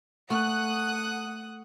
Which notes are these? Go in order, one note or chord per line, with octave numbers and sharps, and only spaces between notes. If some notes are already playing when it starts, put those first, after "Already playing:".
A3 F#5 D#6 F#6